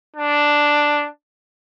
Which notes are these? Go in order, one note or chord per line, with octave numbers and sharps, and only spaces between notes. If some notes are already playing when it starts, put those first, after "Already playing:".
D4